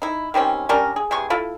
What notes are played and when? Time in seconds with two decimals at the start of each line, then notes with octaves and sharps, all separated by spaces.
0.02 D#4 E4
0.34 D#3 G3 C4 C#4
0.69 G3 C#4 D4 A#4
0.96 G#4
1.11 C3 E3 G#4 C#6
1.30 E4 F4 A4